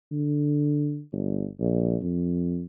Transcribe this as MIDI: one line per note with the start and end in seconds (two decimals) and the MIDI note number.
0.11 1.01 50
1.12 1.46 31
1.60 1.96 34
2.02 2.65 41